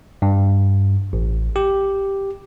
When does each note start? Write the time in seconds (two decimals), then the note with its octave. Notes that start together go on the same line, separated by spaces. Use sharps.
0.22 G2
1.13 A1
1.56 G4